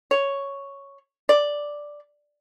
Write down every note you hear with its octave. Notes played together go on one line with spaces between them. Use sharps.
C#5
D5